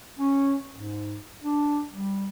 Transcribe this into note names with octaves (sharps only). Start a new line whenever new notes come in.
C#4
G#2
D4
G3